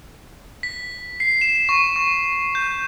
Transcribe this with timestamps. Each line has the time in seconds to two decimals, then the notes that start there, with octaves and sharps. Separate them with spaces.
0.63 B6
1.20 C7
1.41 E7
1.69 C#6
1.96 C#6
2.55 G6